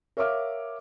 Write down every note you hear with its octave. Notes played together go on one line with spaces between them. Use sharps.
A#4 C#5 E5 F5 D6 F6